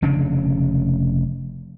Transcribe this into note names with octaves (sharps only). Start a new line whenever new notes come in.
F1 C#3 C#4 D4